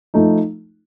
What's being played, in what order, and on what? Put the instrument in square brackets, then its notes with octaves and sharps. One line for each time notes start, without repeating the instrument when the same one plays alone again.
[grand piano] F3 A3 D#4